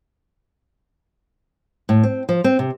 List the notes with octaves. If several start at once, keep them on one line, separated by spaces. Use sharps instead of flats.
A2
C4
F3
C4
C3